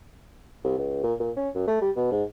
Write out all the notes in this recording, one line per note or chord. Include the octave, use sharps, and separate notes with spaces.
C2
C#2
A#2
A#2
C#4
F#2
A3
G3
B2
G#2